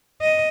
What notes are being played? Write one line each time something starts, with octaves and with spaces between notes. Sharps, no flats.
D#5